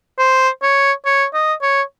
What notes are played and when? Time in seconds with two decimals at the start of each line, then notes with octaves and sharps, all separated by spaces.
0.19 C5
0.62 C#5
1.05 C#5
1.33 D#5
1.62 C#5